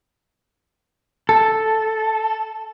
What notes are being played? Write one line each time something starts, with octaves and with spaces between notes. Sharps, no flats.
A4